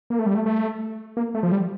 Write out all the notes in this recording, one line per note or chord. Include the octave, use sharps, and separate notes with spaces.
A#3
A3
G3
A3
A3
A#3
A3
F3
G3